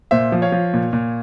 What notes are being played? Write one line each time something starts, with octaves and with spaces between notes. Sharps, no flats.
A#2 C5 E5
F3
C#5 F5
F3
A#2
A#2